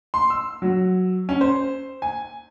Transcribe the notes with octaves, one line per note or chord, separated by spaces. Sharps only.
C6
E6
F#3
C#4
C5
G#5